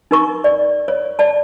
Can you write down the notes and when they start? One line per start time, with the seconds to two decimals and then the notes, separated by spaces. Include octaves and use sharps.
0.11 D#4 A#4 C#6
0.44 D5
0.88 C#5
1.19 D5 A5